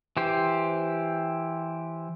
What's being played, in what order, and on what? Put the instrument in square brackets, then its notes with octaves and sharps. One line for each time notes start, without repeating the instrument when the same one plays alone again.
[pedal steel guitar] E3 G4 C5